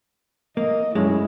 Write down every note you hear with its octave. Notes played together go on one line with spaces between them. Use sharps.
A#3 D#5
F#2 G#3 A3 C#4 E4